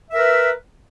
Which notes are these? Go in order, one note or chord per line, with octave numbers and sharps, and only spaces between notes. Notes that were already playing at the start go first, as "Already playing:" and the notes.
A#4 B4 E5